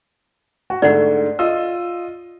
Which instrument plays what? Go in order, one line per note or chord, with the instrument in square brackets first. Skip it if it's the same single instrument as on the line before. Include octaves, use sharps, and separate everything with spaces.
[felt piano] F#4
[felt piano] G#2 D3 A3 [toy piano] D5 F#5
[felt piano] F4 D#5 E6